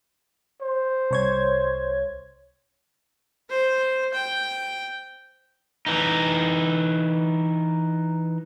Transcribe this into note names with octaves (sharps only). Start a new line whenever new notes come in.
C5
C2 C#5 G#6
C5
G5
E3 D#4